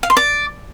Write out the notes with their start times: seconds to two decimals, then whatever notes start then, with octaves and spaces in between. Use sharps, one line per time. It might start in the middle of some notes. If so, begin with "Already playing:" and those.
0.03 F5
0.10 C6
0.17 D5